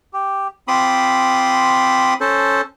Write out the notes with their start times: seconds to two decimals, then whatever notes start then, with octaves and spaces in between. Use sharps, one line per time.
0.13 G4
0.68 C4 F4 B5 C6 D6 D#6
2.21 C#4 A4 C5 A5